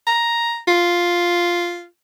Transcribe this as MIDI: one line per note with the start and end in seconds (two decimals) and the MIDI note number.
0.07 0.58 82
0.68 1.85 65